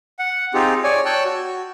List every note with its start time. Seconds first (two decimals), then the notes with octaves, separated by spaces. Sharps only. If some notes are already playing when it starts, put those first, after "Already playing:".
0.19 F#5
0.54 C4 D#4 F4 G4 G#4
0.84 C#5 D5 G#5
1.06 C#5 G5 A5 E6 F#6
1.25 F#4